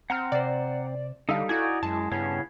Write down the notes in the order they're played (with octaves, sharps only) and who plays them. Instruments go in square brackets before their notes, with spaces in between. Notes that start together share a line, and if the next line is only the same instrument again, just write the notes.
[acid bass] C4 [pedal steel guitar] F#5 A#5 F6
[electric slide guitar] C3 C5 [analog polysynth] D5
[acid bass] D3 [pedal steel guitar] G3 D#4 [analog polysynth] A4 F5
[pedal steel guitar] D#4 D5 G#5 [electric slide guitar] E4 [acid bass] F#4
[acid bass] F#2 [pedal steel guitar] G#3 [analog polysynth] A5
[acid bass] G2 [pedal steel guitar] C#3 B3 C#4